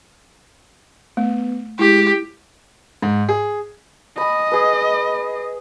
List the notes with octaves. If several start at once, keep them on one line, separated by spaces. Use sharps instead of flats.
A3 B3
G#3 E4 G4
G#2
G#4
D#5 G#5 B5
G#4 B4